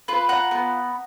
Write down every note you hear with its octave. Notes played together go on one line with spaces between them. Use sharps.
F4 B4
F#5 A#5
B3